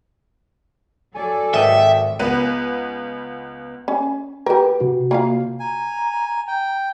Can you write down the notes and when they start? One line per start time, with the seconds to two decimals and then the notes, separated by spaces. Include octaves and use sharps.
1.14 F#3 A4 D5 G#5
1.54 G#1 D#5 E5 G5
2.19 C#2 B3 B4 D#7
3.88 C#4
4.46 G4 A#4 B4
4.81 C3 F#4
5.11 A#3 F4 F5
5.60 G#5 A#5
6.48 G5